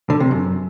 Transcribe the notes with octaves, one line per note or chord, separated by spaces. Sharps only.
D3
C3
F#2